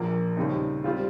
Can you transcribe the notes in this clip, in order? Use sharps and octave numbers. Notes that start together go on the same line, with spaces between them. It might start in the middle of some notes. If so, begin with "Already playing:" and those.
Already playing: A#1 A#2 F3 A#3
D#2 C#3 G3 C4 D#4
G3 C4 F4